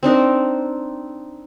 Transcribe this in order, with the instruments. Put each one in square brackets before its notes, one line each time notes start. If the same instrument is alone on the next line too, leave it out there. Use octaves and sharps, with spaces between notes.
[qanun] C4 D4 D#4 A#4